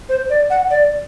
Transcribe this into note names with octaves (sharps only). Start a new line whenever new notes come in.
C5
D5
F#5
D5